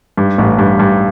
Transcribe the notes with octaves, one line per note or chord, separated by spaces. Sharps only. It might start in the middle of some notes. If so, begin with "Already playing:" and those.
G2
A1
G2
G2